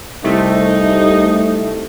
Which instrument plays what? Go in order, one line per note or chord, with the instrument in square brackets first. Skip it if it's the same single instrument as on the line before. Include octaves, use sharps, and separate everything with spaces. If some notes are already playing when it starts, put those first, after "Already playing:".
[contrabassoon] C2 [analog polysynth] C3 A3 [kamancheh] D#4